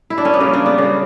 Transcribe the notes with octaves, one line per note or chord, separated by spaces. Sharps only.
E4
D4
C#4
B3
C#3 G3 A#3
D4
B3
C#3 G3